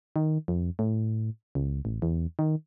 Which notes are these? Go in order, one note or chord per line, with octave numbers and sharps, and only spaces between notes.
D#3
F2
A2
C#2
A1
E2
D#3